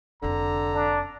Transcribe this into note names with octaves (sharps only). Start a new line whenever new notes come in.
F1 D3 C4 A#5
D4